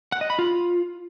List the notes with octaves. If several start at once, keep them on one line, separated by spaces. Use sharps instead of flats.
F#5
D#5
B5
F4